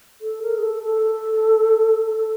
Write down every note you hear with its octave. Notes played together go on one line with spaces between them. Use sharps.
A4
A#4
G#4
A4
A4
A4